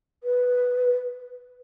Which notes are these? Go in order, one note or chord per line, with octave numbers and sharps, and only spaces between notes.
B4